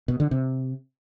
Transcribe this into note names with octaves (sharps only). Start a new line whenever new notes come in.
B2
D3
C3